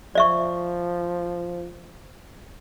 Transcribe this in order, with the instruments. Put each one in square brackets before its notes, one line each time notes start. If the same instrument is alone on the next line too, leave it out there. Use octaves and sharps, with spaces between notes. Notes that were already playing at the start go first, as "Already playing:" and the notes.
[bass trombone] F3 [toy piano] D5 E5 C#6